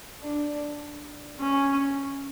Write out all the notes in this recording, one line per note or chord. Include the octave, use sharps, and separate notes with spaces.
D4
C#4